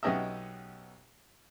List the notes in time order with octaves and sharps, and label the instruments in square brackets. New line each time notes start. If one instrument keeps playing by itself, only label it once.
[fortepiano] B1 B3 C#4 G4 D#5 E5